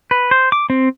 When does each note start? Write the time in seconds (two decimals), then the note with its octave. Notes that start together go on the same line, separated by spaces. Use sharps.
0.11 B4
0.31 C5
0.52 D6
0.70 C4